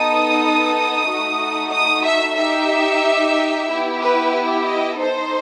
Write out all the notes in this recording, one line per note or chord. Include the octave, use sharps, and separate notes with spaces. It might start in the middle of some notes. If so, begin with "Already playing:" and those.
Already playing: B3 D#4 A4 D#6
A3 D#4 F#4
D#6
E5
D#4 G4 E5
B3 E4 G4
B4
D#5
D#4 A4 C5